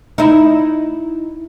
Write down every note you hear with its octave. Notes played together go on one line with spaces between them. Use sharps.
D#4 E4